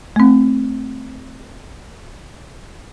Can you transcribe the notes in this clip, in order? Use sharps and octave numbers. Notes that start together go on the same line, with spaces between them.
A3 C4